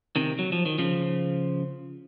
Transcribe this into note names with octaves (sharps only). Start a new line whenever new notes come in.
C3 D#3
F#3
F3
D#3
C#3 F3